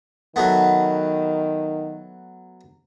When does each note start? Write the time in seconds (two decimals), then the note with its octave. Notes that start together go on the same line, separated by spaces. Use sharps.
0.36 D#3 F#3 A3 B3